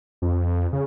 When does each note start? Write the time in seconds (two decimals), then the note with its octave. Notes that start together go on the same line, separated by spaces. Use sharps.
0.22 F2
0.73 C#3